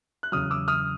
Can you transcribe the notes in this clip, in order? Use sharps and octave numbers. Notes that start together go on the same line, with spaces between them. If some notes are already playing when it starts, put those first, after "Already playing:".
F#6
E2 C#3 F#3 D#6 F6
D6 E6
D#6 F6